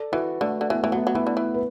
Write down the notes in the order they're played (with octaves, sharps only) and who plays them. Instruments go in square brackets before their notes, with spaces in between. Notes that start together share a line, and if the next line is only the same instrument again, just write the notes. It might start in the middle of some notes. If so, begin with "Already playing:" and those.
Already playing: [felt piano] A4 D5
[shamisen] E3 [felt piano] F#4 B4
[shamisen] D3 [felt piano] A3
[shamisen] D3
[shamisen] E3 [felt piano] B3
[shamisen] E3 [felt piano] A3
[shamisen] F#3 [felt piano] B3
[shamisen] F#3
[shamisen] E3 [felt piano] B3 E4
[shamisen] D3
E3
[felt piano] B4